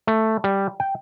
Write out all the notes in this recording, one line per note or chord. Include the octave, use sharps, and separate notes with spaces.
A3
G3
G5